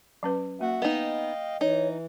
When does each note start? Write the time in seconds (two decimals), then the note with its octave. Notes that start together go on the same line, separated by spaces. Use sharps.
0.23 F#3 C#4 B4
0.61 A#3 F#4 E5 F#5
0.82 B3 D#4 D#5 F5 G5
1.61 E3 D#4 C#5